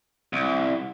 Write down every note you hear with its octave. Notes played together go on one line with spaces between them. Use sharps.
C2